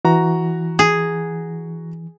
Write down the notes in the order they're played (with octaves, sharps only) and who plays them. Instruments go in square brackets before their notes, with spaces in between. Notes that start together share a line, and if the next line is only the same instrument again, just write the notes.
[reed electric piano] E3 [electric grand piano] F#4 A#5
[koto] G#4